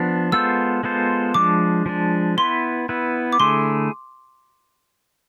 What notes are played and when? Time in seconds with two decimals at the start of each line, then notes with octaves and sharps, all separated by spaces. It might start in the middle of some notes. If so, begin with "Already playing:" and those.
Already playing: F3 B3 D4
0.32 G#3 B3 F4 A4 C5 E6
0.83 G#3 B3 F4 A4 C5
1.34 F3 G#3 D4 D6
1.86 F3 G#3 D4
2.37 B3 E4 B4 C6
2.89 B3 E4 B4
3.33 D6
3.40 D3 A3 E4 G#4 C6